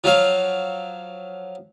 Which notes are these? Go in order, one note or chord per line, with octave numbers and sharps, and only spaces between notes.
F3 F#3 F5